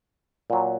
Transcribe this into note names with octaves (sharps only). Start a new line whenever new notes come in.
A#2 F#3